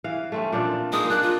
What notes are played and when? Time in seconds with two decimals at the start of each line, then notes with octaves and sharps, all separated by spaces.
0.04 E3 F5
0.32 A3 C4 C#4
0.52 A#2 F3 D4
0.92 G#3 A#3 D#4 D#6
1.10 A#3 D4 F#6
1.22 F4